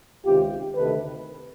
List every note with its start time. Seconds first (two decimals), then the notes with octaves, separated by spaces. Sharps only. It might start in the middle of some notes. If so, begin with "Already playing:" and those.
0.24 C#2 C3 D#3 F4 G4
0.75 D2 C3 D#3 A4 B4